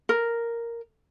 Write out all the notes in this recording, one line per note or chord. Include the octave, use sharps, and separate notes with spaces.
A#4